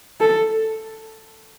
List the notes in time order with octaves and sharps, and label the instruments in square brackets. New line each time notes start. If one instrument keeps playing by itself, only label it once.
[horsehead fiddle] A4